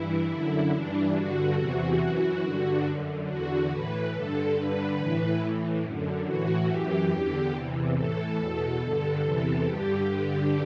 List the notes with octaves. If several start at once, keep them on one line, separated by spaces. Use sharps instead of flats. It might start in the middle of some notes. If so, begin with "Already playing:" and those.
Already playing: G2 E3 E4
F#2 D3 E4
G2 E3 D4
G2 D3 F#4
E2 C3 E3 F#4
F#2 E3
G2 D3 F#4
F#2 D3
E2 D3 F#4
A2 E3 B4
G2 D3 A4
G2 D3 B4
A2 E3
A2 E3
F#2 D3
A2 E3 F#4
F#2 E3 G4
E2 D3
E2 C3 E3
A2 E3 A4
E2 B2
G2 D3 A4
E2 C3 E3 A4
G2 D3 G4
G2 D3 G4